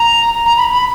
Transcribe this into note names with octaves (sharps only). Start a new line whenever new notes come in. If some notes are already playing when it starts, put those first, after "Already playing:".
Already playing: A#5
A#5
B5
B5